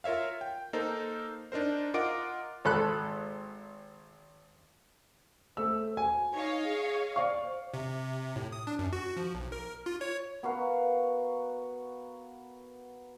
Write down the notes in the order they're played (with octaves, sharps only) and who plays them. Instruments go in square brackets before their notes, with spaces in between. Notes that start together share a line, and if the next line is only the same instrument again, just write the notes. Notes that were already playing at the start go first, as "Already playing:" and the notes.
[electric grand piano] F4 A#4 C#5 E5 F5
G5
A#3 D#4 A4 A#4 C5
D4 D#4 A#4 C5
F4 A#4 D#5 F#5 D6 D7
[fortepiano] G#1 A4 B5 F#6
[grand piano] A3 E6 [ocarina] C5
[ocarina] F#4 [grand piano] G#5
[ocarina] D#4 [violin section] C#5 D#5 F5
[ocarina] G#4
[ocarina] C5 [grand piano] D5 F5 C#6
[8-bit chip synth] C3
A2
D#6
D4
F#2
F#4
F3
B1
A#4
F4
C#5
[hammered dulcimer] B3 F#4 A#4 F5